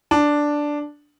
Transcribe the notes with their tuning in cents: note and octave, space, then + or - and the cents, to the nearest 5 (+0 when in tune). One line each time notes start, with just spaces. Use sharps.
D4 +0